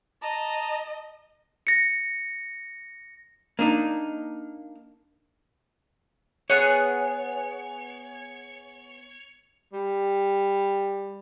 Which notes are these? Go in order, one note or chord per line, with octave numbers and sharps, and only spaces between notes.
D#5 A5 A#5
A#6 C#7
A#3 D4 D#4
B3 G#4 C#5 F#5
G3